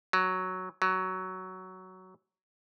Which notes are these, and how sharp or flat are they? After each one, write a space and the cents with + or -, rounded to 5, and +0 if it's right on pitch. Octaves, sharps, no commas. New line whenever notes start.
F#3 +0
F#3 +10